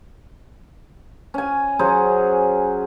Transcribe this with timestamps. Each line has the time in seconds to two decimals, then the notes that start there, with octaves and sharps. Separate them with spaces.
1.34 C#4 G#5
1.79 F#3 C#4 G#4 C5